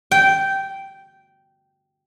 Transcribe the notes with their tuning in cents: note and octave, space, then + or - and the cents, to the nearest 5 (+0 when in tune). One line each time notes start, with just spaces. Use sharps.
G5 -10